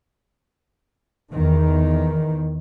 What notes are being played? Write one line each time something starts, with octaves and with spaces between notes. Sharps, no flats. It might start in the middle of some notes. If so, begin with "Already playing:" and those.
E2 D#3